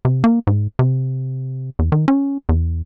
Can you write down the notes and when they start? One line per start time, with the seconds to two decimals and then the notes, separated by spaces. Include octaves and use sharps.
0.05 C3
0.24 A#3
0.47 G#2
0.79 C3
1.79 E2
1.92 D#3
2.08 C#4
2.49 E2